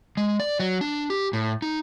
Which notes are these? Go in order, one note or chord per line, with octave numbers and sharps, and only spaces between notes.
G#3
D5
F#3
D4
G4
A2
D#4